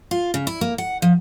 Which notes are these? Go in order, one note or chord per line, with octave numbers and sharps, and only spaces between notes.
F4
C#3
E4
A#3
F#5
F3